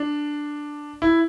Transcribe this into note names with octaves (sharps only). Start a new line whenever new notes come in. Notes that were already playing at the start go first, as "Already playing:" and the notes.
Already playing: D4
E4